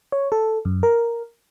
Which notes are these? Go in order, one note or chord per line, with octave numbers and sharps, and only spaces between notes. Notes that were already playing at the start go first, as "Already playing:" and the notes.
C#5
A4
F#2
A#4